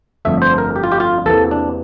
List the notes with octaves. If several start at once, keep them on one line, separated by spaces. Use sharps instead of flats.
G1 F2 D3 A3 E5
C5
A#4
G4
F4
G4
F4
E2 C3 E3 A#3 A4
D4